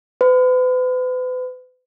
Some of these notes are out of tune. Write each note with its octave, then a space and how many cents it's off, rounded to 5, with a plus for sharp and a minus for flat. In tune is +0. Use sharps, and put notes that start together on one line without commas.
B4 +40